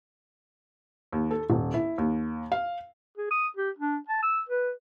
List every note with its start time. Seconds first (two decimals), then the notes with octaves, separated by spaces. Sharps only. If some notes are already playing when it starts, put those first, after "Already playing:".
1.12 D#2
1.31 A4
1.50 D#1
1.74 E4
1.98 D#2
2.52 F5
3.18 G#4
3.31 D#6
3.57 G4
3.78 D4
4.08 A5
4.23 E6
4.49 B4